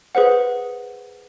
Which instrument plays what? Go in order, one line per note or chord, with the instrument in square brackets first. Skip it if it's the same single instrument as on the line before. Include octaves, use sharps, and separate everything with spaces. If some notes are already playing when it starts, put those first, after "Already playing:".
[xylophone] G#4 B4 C5 F#5